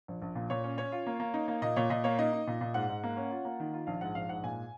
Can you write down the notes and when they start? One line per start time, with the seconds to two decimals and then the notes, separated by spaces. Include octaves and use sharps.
0.08 A#1
0.22 A#1
0.35 A#2
0.50 A#2 C#5
0.64 C#4
0.77 C#4 C#5
0.92 F4
1.07 A#3
1.20 A#3
1.34 D#4
1.48 A#3
1.62 A#2 D#5
1.76 A#2 C#5
1.90 A#2 D#5
2.04 A#3 C#5
2.19 D#4 D#5
2.33 D#4
2.47 A#2
2.61 A#2
2.74 G#2 F#5
2.89 G#2
3.03 A#3
3.17 C#4
3.31 F4
3.45 A#3
3.60 D#3
3.73 F4
3.87 A#1 F5
4.01 G#2 F#5
4.15 A#1 F5
4.29 G#2 F#5
4.44 A#2 G#5